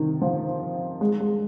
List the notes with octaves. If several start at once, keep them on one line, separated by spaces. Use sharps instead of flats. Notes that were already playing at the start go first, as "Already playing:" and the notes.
Already playing: C3 D#3
F3
G#3
G#3